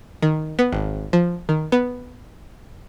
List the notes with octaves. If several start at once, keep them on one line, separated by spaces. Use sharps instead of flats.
D#3
B3
G#1
F3
D#3
B3